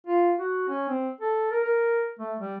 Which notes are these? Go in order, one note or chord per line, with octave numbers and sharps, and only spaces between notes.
F4
F#4
C#4
C4
A4
A#4
A#4
A3
G3